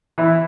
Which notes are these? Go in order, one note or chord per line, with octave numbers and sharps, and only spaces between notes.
E3 E4